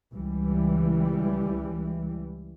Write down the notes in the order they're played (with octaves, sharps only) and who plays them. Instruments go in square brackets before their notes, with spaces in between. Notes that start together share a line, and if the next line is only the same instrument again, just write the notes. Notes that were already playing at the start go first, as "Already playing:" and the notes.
[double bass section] C#2 E3 G3